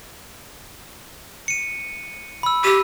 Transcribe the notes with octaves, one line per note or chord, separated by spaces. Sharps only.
C#7 D#7
B5 E6
G4 E6 D#7